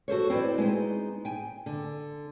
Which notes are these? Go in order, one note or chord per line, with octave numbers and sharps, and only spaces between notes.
F#4 A4 C5 C#5
C4 E4 B4 C5 D5
G#3 B3 D#4
G5 G#5
D3